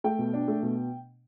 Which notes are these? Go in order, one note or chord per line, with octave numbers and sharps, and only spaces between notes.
A3 G5
B2
D4
A3
B2